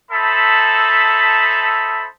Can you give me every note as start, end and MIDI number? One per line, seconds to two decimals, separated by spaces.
0.10 2.06 63
0.10 2.06 69
0.10 2.06 72
0.10 2.06 76
0.10 2.06 81
0.10 2.06 83